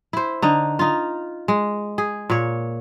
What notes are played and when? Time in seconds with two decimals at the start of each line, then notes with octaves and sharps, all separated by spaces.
0.13 E4 C5
0.42 D3 D#4
0.79 D#4 F4
1.48 G#3
1.98 G#4
2.30 A#2 C#5